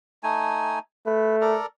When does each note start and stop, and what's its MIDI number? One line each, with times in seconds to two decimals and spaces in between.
0.23 0.79 57
0.23 0.79 63
0.23 0.79 80
1.06 1.58 57
1.06 1.36 71
1.41 1.66 69
1.41 1.66 70
1.41 1.66 74